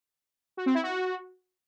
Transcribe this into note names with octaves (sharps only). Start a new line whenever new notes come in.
F#4
C4
E4
F#4